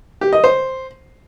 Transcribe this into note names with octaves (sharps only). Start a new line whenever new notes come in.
G4
D#5
C5